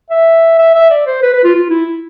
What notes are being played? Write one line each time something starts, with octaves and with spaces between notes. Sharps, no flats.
E5
E5
E5
D5
C5
B4
B4
F4
F4
E4